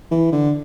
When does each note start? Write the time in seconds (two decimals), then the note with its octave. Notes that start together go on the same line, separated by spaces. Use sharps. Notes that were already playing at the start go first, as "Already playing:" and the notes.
0.11 E3
0.32 D3